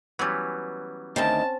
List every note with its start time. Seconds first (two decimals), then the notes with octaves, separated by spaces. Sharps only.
0.19 E3 F#3 G3 B3 C#4
1.16 D2 D#3 C4 C#4 G5 A5